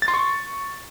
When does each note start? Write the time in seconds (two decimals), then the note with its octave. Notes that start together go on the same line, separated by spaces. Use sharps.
0.02 A6
0.08 C6
0.14 C#6